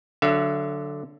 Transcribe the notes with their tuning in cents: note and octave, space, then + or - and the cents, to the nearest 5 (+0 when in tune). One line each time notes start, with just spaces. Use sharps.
D3 +0 F#3 +0 E5 +40